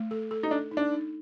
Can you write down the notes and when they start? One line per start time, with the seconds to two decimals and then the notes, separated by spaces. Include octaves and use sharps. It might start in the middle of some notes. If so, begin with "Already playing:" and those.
Already playing: A3
0.11 A4
0.31 A4
0.43 D#4
0.50 D4 A4
0.71 D#4
0.77 D4
0.91 D#4